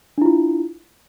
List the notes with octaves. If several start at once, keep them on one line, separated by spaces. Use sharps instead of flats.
D4 E4 F4